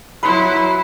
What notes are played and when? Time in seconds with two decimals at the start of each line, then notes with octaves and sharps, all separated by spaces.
0.23 F#3 E4 B4 C6